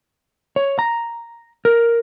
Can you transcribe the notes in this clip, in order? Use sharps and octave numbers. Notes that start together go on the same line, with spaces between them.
C#5
A#5
A#4